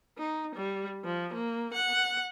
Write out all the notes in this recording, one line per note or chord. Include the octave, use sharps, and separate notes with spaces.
D#4
G3
F3
A#3
F#5